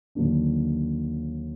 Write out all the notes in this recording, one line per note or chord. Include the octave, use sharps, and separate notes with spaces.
D#2 D3 F#3 A#3 D4